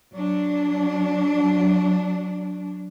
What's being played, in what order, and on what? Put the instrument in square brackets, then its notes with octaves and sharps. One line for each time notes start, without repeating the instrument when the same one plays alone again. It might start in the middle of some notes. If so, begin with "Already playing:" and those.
[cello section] F#3 D4